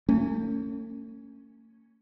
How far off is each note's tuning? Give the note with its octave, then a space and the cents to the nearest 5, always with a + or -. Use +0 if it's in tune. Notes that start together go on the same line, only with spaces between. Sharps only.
A3 +45 C#4 +0